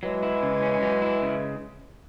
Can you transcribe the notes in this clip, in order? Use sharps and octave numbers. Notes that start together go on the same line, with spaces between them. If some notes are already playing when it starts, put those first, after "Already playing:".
E3 F#3 G#3
E4
C#3
C#4
F#3
E4
C#3